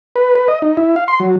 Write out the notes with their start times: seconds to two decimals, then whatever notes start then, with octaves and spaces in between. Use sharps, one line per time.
0.16 B4
0.35 B4
0.48 D#5
0.62 D#4
0.77 E4
0.96 F5
1.08 C6
1.20 F#3